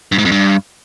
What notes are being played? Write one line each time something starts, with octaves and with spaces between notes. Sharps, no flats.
G2
G#2
F2
G2